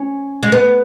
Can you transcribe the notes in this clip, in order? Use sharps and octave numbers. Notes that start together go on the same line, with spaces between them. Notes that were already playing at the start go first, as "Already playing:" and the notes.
Already playing: C#4
G#3
B3